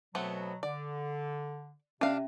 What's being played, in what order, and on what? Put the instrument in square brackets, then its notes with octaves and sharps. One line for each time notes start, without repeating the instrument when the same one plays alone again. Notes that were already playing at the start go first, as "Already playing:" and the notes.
[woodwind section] B2 F#3 [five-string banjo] A3 B3 C4
[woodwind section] D3 [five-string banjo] D5
[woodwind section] C3 [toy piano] C#4 E5 [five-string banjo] D4 F5